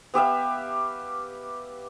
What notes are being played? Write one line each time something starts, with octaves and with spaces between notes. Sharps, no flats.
B3 G4 E5 F5